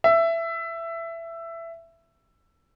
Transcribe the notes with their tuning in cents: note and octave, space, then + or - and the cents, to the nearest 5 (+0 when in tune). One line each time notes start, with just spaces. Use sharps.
E5 +15